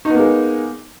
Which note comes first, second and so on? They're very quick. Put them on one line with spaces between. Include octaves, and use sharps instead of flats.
D#4 B3 A#3 G#3